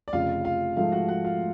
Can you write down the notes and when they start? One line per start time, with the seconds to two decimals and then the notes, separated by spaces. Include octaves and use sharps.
0.08 D5
0.13 F1 F2 C#3 F4 F5
0.45 F4 F5
0.77 G#2 F3 A3 F4 F5
0.92 F#4 F#5
1.08 F#4 F#5
1.25 F4 F5